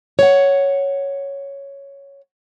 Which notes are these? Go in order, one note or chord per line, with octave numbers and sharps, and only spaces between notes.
C#5 F#5